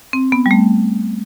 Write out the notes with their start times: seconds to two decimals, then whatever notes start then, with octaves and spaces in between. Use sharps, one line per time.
0.13 C4
0.32 B3
0.46 G3
0.51 A3